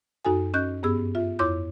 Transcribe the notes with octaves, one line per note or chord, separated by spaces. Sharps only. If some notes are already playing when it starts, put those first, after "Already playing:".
F#2 D#4 F#4 A4 G#5
C#4 D#5 F#6 G6
G2 B3 G#4 E6
F4 E5
F2 E4 C#5 C6 D6 G6